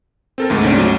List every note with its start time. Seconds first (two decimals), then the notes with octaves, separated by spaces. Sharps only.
0.38 C4 A4 A#4
0.50 D2 G#2 A3
0.65 C#3 C4 D4
0.78 F#2 F#3